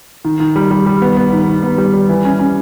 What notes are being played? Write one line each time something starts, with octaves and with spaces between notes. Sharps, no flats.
D#3
D#3
G3
G3
G3
B3
B3
D#3
D#3
B3
G3
G3
E3
C#4
C#4